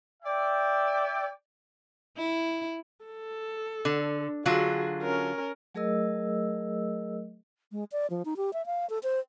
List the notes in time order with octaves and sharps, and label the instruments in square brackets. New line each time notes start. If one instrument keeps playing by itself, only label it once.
[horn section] D5 E5 G5
[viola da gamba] E4
[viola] A4
[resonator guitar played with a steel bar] D3
[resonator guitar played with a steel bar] D3 F#3 F4 [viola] F#4 G#4
[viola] C#4 A#4
[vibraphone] F#3 A3 G#4 A#4 D#5 E6
[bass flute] G#3
D5
F3
D#4
G4
E5
F5
A4
C5